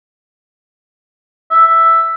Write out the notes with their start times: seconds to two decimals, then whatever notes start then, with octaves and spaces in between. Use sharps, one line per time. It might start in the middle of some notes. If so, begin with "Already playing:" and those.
1.51 E5